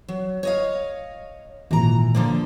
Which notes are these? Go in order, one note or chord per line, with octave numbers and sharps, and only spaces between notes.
F#3
C#5 D#5 F5
G#1 A#2 E3 A#5
D3 F3 A#3